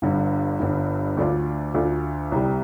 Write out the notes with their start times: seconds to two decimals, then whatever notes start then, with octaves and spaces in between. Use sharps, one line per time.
0.02 G1 G2 D3
0.60 G1 G2 D3
1.17 D2 D3 A3 D4 F4
1.74 D2 D3 A3 D4 F4
2.32 C2 C3 G3